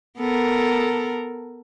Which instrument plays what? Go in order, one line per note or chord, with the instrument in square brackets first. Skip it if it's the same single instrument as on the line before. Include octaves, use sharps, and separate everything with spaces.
[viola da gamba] B3 A4 A#4